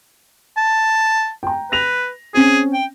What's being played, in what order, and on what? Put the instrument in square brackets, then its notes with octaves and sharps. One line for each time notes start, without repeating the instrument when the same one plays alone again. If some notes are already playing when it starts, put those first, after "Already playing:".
[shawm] A5
[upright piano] G5 A#5
[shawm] B4 [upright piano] A#6 F7
[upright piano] C4 C#4 [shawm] G#4
[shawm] G5